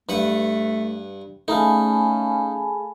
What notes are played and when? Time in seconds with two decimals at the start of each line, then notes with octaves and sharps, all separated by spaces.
0.09 G2 A3 B4 F#5
1.48 A3 C#4 D#4 G#4 F5 G#5 A5 B5